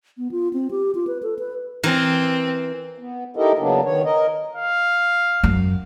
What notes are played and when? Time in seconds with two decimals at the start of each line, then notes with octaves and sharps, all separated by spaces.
0.18 B3
0.31 F4
0.53 C4
0.71 G4
0.95 F4
1.07 B4
1.23 A4
1.39 B4
1.83 E3 C4 A#4
2.98 B3
3.36 D#4 E4 G4 A4 A#4 D#5
3.59 C#3 F#3 A#3 B3 D4
3.85 D#3 B3 C#5
4.05 A#4 D#5
4.55 F5
5.44 F#2